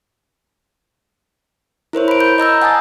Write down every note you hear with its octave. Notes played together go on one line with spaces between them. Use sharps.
E4 A#4 C5 C#5
B5 D7
G6
D#5 A#5 E6 G6
F#5 G#5 A5 D#6 A6